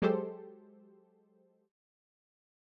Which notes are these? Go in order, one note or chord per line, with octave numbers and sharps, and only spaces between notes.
F#3 G#3 G4 A4 C5